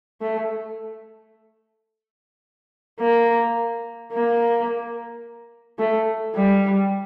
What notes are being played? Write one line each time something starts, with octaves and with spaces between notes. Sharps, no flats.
A3
A#3
A#3
A3
G3